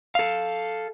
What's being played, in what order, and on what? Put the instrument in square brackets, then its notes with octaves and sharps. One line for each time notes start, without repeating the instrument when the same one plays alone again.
[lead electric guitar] A4 F5